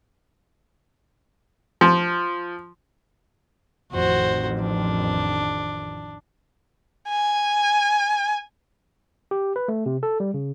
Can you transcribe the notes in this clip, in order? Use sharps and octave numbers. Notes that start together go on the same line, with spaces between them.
F3
A1 F2 D#3 F#4 C5
D4
G#5
G4
B4
A3
C3
A4
G3
C#3